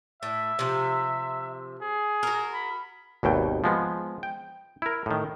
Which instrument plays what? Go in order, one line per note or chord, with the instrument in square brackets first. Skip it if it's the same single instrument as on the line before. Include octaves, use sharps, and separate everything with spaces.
[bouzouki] A2 [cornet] E5
[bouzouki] C3 F3
[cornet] G#4
[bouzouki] F#4 A#4
[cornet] B5
[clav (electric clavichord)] G#1 D#2 B2 G5
F3 G#3 B3
G5
E4 A#4
A2 D#3